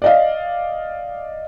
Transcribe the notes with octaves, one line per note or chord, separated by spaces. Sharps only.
D5 D#5 F5